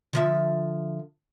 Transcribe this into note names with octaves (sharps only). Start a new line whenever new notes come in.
D3 F3 E5